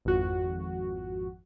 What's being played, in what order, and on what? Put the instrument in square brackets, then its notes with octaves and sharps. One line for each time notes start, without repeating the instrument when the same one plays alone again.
[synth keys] G#1 F2 F#4